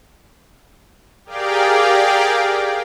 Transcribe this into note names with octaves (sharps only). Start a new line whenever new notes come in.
G4 G#4 A#4 D5 F5 G5